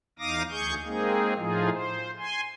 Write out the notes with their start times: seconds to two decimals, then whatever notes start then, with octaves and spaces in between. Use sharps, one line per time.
0.19 E2 D#4 F5 D6 D#6 A#6
0.51 D2 G#4 C#6 G6
0.84 G#3 A#3 C4 D#4 G#4
1.36 A2 F3 D#4 F4 G#4
1.70 C5
2.19 G#5 C6